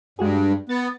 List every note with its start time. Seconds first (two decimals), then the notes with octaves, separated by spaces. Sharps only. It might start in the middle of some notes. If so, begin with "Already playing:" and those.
0.19 G2 G#3 F#4 G#4
0.69 B3 A6